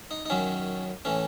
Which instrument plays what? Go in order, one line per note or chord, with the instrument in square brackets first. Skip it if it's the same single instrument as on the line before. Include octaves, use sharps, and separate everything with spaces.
[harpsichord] D#4
D#4
F#2 D#3 F#3 C#4
A2 E3 C#4